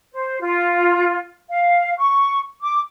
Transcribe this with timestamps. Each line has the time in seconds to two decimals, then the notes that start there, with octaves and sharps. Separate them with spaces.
0.13 C5
0.41 F4
1.50 F5
1.97 C#6
2.62 D6